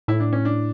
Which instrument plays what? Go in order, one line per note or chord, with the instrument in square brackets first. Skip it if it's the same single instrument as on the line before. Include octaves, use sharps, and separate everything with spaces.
[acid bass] A2 [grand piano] E4
[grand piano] D4
C#4
D4